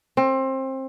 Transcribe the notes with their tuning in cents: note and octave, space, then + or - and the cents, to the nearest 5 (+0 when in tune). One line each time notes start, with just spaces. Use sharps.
C4 +25